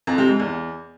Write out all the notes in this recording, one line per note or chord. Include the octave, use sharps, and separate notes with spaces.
F2
C3
G#2
E2